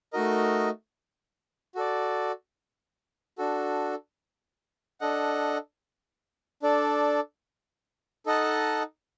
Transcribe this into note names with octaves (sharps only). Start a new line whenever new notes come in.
A3 D#4 F#4 A#4 D#5
F#4 A4 D5
D4 F#4 A4
D4 A4 D#5 F#5
D4 A4 D5
D#4 A4 D#5 F#5 A5